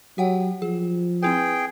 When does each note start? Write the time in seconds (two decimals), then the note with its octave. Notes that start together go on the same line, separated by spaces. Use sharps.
0.18 F#3 G4 F#5 G5
0.62 F3 G#4
1.23 C4 E4 G#4 B4 G5